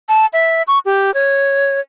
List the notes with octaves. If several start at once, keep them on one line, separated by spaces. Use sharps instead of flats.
A5
E5
C#6
G4
C#5